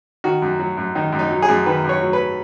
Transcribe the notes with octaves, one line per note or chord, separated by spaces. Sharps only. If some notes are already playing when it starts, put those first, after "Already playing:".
D#3 F#4
F#2
F#3
F#2
D#3 D#4
F#2
D#4
F#3
G#4
F#2
D#3 B4
F#2
C#5
F#3
B4